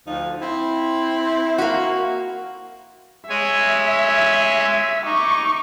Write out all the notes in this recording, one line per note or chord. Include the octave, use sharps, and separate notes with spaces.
D2 F3 D#4
C4 E4
A#3 F#4
G#3 C#5 E5 G#5
D#4 C#6 D6